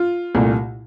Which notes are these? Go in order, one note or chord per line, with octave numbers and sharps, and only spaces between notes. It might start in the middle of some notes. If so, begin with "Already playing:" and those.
Already playing: F4
C2 A#2 A3